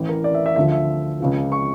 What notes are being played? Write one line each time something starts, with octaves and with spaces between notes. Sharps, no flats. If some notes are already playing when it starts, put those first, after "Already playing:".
Already playing: A1 A2 E3
A#4
D5
E5
E5
D2 D3 F3 E5
E5
C#2 C#3 F3
C#6